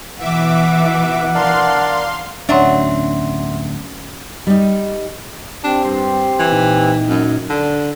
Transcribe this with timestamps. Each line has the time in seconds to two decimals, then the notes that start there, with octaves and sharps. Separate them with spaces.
0.19 B2 E3 E5 F#5 D6
1.35 D4 A#4 D5 F5 C6
2.49 D1 F#3 C#4 D4 D5 E5 F#5 C6
4.47 G3 D#4
5.64 C4 D4 G4
5.84 G2 C6
6.39 E3
6.52 A#2 D#4
7.08 F#2
7.50 D3 D4